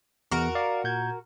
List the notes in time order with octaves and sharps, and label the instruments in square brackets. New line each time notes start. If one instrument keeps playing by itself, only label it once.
[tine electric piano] E2 [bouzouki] F#4 A#4
[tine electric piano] D5 F5
A#2 G6 G#6